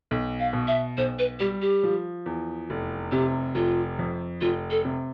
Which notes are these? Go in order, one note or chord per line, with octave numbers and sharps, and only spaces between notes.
B1
F5
B2
E5
B1 C5
B4
G3 G4
G4
F3
E2
F1
C3 G4
F1 F4
F2
F1 F4
A4
C3